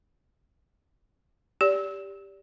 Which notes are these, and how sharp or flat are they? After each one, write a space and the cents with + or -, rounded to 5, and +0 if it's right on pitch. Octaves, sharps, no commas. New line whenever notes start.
G4 +10 D5 -30